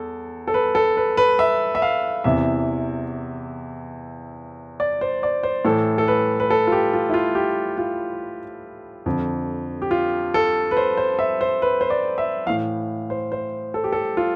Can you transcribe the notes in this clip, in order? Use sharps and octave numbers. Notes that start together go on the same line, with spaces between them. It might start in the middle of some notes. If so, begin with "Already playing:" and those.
Already playing: E2 A4
A4
B4
A4
B4
B4
E5
E5
F5
E2 C3 E3 E5
D5
C5
D5
C5
A2 E3 A4
A4
B4
B4
A4
F4
G4
F4
E4
F4
G4
F4
F2 D3
G4
F4
A4
B4
C5
C5
E5
C5
B4
C5
D5
E5
A2 E3 F5
C5
C5
A4
G4
A4
F4